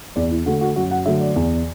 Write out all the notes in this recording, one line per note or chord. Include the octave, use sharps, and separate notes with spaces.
E2 D5
E4
D3 A3 F#4
F#4
F#2 F#4
F#5
D3 F#3 A3 E5
D5
E2